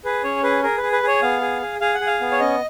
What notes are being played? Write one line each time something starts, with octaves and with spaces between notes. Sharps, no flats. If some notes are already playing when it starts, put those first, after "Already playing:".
G#4 B4
C#4 C#5
G#4 B4
G#4 A#4
B4
G#4
B4
G#4 C#5
B3 F5
G#4
G#4
G#4 F5
F#5
G#4
F5
B3
C#5
C#4 D#5